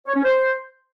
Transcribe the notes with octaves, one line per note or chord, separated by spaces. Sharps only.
C#5
C#4
C5